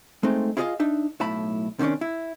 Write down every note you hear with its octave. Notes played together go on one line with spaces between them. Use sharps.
G#3 A3 C4 D#4
E4 F4 G#4 A#4 D#5 F5
D4 D#4 E5
B1 A2 E4 A5 B5
C3 D#3 A3 C#4 D4
E4